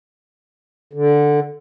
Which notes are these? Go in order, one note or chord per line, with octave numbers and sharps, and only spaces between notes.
D3